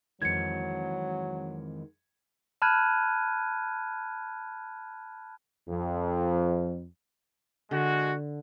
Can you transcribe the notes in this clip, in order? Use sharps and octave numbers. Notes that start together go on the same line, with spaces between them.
F2 D#3 E3 F#3 G#3 G#6 C#7
A5 B5 F6 F#6 G#6 D#7
F2
D3 G#3 F#4